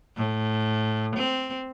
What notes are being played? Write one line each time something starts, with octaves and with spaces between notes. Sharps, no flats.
A2
C4